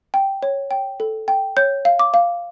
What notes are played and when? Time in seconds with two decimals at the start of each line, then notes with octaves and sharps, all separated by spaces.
0.14 G5
0.43 C#5
0.71 G5
1.00 A4
1.28 G5
1.57 C#5 G6
1.85 F5
1.99 D6
2.14 F5